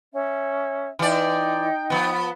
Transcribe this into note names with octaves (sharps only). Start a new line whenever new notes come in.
C#4 E5
E3 D#4 D5 G5
F3 B3